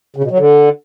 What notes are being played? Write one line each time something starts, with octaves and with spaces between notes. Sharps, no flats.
C#3
B2
F#3
D3